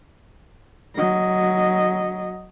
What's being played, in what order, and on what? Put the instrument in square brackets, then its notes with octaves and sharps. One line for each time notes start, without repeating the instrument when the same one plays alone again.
[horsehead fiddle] F#3 D#5